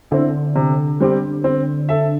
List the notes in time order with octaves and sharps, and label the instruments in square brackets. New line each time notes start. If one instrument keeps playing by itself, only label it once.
[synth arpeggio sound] D3 [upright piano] C4 E4
[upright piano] C3
G3 C4 G4
C4
A4 E5